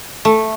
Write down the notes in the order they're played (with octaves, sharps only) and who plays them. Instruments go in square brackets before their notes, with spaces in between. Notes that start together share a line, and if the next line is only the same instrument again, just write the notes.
[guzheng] A3